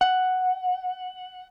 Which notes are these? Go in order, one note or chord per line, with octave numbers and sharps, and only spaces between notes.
F#5